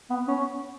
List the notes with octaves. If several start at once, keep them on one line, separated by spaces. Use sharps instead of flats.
B3
C#4